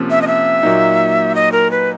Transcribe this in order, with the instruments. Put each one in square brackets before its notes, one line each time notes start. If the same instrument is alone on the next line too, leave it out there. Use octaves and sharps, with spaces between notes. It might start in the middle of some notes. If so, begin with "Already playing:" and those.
Already playing: [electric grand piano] C3 F3 A#3 C#4
[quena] E5
D#5
E5
[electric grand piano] A#2 F#3 A#3 D#4
[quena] D#5
A#4
B4